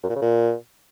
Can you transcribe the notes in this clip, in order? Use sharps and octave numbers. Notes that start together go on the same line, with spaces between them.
F#2
A#2
C#3
A#2